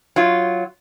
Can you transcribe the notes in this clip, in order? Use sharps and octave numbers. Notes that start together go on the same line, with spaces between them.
F#3 F4